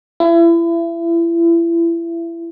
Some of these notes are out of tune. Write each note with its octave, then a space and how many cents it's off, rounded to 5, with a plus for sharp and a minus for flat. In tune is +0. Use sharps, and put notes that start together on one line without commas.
E4 +30